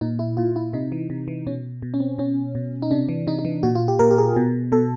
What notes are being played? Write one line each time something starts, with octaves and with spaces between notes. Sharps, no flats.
A#2 D#4
E4
A#2 F4
E4
C3 D#4
E3
C3
E3
B2 C#4
B2
C#4
C4
B2 C#4
B2
D#4
C3 D4
E3
C3 D#4
D#4
E3
A#2 F#4
F4
G4
A#2 A#4
G4
G#4
B2
B2 A4